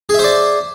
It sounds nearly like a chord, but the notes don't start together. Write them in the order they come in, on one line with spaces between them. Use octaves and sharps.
G#4 E5 C5 D5